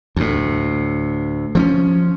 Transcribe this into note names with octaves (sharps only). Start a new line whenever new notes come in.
D2 A2
F3 C4 C#4